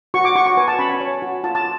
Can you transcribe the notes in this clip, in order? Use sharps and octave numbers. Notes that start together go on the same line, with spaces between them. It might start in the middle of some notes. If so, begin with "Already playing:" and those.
F#4 C#6
D6
F#4 C#6
C#6
B4 G#5
A5
C#4 B5
G#5
C#5
F#4
F4 A5
A5